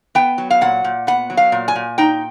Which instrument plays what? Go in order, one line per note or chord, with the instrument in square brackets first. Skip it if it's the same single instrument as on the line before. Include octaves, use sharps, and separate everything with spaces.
[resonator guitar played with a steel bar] B3 G5
F#3
F5
A#2 F#5
A#2
B3 F#5
F#3
F5
A#2
G#5
A#2
D#4 G5